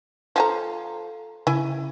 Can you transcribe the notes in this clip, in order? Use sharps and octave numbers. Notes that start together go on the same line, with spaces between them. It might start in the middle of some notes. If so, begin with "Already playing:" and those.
F3 A4 G#5 A#5 C6
C#3 E4 G#5